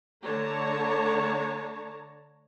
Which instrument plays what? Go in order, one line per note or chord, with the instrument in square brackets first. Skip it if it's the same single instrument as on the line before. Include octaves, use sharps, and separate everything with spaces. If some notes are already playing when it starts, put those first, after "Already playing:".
[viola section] D3 A3 D4 C#5 A5 A#5